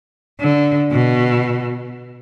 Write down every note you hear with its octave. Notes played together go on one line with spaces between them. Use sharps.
D3
B2